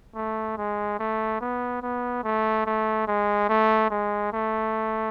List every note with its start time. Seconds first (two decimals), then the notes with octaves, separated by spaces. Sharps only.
0.15 A3
0.58 G#3
0.99 A3
1.41 B3
1.82 B3
2.24 A3
2.66 A3
3.08 G#3
3.49 A3
3.90 G#3
4.33 A3